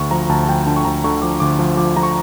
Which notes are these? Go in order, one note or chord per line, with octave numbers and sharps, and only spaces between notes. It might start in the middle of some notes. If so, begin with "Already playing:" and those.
Already playing: D2 C#6
F3 A#5
D2 A5
A5
F3 G5
D3 A5
C#6
D2 A#5
D3 C#6
F3 D6
D2 D6
F3
F3 D6
F3 A#5
C#6